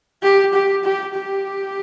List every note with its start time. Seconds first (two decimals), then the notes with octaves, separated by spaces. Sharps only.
0.23 G4
0.54 G4
0.84 G4
1.15 G4